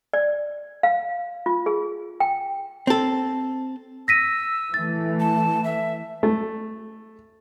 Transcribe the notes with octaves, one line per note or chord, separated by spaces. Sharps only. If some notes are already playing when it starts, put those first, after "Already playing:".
D5
F5
F4
G#4
G5
C4 A4
E6 A#6 B6 D#7
E3 A3 A6
A5
E5
A3